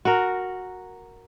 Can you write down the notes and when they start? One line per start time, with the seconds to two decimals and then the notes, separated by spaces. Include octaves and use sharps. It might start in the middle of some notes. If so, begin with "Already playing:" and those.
0.05 F#4 A#4